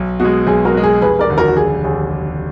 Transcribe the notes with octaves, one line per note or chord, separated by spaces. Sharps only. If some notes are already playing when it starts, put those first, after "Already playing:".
Already playing: B1
B2 G#3 F#4
B1 G#4
F#4 A#4
B2 G#3
G#4
F1 G#4 B4
A#4 D5
D#2 D3
F#4 A#4
F#4
F1 G#4
D#2 D3 G#4